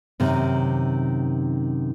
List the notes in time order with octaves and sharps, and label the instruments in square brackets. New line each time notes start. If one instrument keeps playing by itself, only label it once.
[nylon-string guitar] F#2 C3 D#3